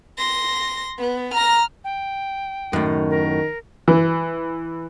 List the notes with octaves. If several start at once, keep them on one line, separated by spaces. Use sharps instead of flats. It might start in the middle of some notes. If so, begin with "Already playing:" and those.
C6 A#6
B3
A#5 F6 A#6
G5
F#2 A2 D#3
A#4
E3